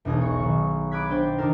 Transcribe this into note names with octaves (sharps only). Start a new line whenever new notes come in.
E1 B1 D#4 G#4 G#5
C#5 C#6
D#3 F#3
B5 D6 D#6 F#6 G#6 B6
D4 C5 G5
D#3 D4 D#4 A4 A#4